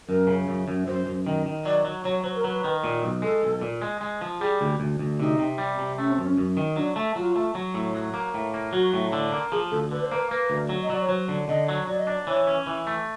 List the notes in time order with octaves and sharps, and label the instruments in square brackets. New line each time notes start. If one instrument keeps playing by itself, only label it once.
[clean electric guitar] F#2 [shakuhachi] A#4
[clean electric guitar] C#3
F#2
F#2
[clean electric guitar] F#2 [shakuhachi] C5
[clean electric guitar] F#2
D#3
D#3
[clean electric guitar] F#3 [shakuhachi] D5
[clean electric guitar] F#3
[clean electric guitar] F#3 [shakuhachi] C#5
[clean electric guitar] F#3 [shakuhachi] C5
[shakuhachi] A#4
[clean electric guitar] F#3 [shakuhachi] B4
[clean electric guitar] D#3
A#2
B1
[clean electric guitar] G#3 [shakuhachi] A4
[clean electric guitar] B1
A#2
G#3
G#3
F3
[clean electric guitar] G3 [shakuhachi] G#4
[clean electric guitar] D2
D2
D2
[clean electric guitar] C3 [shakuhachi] D#4
[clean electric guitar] C3
G3
C3
[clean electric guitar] A3 [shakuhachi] C#4
[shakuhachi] C4
[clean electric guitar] F#2
[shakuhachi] C#4
[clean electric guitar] F#2
D#3
[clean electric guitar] F#3 [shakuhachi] D4
[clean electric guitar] A3
[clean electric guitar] F#3 [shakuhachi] F4
[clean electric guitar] A3
F#3
A2
F#3
A#3
A2
A#3
[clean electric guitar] F#3 [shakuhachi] F#4
[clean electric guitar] A2
D3
A#3
[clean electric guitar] F3 [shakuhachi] G#4
[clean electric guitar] D2 [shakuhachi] A4
[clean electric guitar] D3 [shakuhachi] B4
[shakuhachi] C5
[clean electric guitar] A#3 [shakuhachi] B4
[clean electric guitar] A#3 [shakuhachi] B4
[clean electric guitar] D2
F#3
[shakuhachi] D#5
[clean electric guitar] F#3 [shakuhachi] D5
[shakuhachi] C#5
[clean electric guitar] F#3 [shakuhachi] C5
[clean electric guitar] D3
[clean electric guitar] D3 [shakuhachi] D#5
[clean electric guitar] F#3
[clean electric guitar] F#3 [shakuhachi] D5
[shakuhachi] D#5
[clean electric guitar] D4 [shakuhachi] D5
[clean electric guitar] E3 [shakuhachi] C#5
[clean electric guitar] C#4
E3
A3